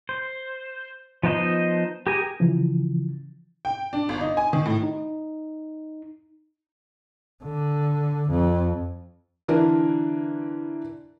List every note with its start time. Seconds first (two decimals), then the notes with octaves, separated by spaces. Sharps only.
0.09 C5
1.23 F3 B3 D#4 C5 D#5
2.07 G4 G#4 A#4 G#5
2.40 C#3 E3 F3
3.65 G5
3.93 D4
4.09 G1
4.21 D#4
4.37 G#5
4.53 D#3
4.66 A2
4.83 D#4
7.43 D3
8.30 F2
9.48 D3 E3 D4 A#4